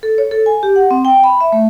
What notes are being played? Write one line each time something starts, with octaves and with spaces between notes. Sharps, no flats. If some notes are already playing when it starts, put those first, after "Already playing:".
A4
C#5
A4
G#5
G4
F#5
C4
G5
B5
E5
A3